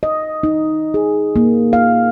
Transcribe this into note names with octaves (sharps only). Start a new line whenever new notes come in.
D#5
D#4
G#4
A#3
F5